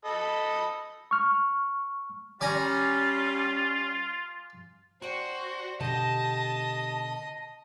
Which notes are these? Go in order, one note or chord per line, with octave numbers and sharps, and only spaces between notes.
A4 D#5 B5
C#6 F6
G3 C#4 F4 D5 G#5 A#5
D4 F#4 C5 G5
B2 D3 G4 D#5 G5 A5